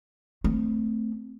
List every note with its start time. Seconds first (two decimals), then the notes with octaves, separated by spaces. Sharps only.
0.44 A3 C4